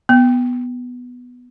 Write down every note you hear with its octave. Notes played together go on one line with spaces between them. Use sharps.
B3